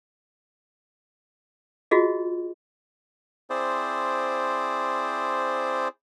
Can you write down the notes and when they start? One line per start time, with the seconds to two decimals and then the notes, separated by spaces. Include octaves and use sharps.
1.91 F4 F#4 G#4 D#5
3.50 C4 E4 G#4 C5 D5